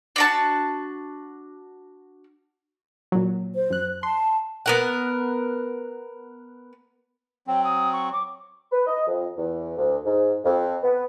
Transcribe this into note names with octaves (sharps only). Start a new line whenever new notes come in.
D4 F#4 A5
A#2 F#3
C5
F#2 F#6
A5 C6
B3 A#4 F#5
F#3 C4 G5
D#6
C#6
D6
B4
D#5
F2
E2
D2
G#2
F2
B3